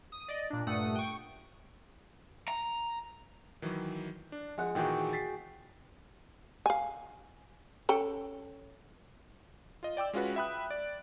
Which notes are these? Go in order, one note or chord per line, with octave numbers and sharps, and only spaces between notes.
D#6
D5 D#5
A#2 D4
G2 A#2 A3 F#5 D#6
G5 C#6
A#5
D#3 E3 F#3
D4
F3 G#3 F#5
A#2 D#3 E3 F#4 G#4 G5
A6 B6 C7
F5 G#5
C#4 A4 G5
F4 D#5
D5 G5 D6 E6
G#3 C#4 F4 F#4 B4
E5 G5 B5 D#6 F#6
D5